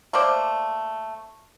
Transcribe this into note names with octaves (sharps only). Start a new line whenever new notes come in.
A3 A#3 C5 D5